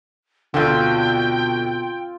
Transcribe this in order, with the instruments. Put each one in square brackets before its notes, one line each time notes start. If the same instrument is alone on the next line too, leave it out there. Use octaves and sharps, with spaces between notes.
[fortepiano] D2 D3 [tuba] B2 [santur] C4 F4 E6 [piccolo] G5